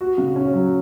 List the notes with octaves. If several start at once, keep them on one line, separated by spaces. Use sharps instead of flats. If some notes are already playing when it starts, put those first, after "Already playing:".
F#4
C#3
C#4
F#3